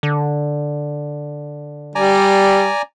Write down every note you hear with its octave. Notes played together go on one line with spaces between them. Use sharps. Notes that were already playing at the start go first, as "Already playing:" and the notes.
D3
G3 D5 G#5 A#5